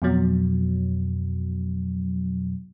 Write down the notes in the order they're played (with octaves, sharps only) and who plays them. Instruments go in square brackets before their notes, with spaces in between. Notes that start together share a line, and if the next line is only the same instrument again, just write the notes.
[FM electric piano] F2 B2 F#3